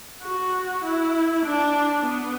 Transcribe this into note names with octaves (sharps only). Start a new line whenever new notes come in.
F#4
E4
D4
B3